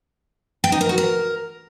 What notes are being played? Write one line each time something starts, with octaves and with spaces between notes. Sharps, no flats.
G5
D#4
A#4
F#4
A#4